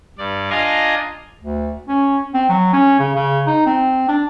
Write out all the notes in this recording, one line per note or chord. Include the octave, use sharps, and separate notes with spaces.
G2 D5
D4 F4 D#5 F5 G#5 A#5
D2
C#4
C4
F#3
C#4
C#3
C#3
D#4
C4
D4